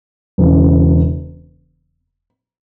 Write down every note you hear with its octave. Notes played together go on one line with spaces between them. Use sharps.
E1 E2 C#3 E3